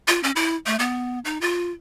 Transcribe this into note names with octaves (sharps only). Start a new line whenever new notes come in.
F4
C#4
E4
A3
B3
D#4
F4